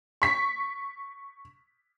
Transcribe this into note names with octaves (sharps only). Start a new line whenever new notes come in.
C#6 B6